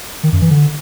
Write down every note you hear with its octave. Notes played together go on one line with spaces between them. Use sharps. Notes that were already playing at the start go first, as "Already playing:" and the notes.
D#3
F#2
E3
D3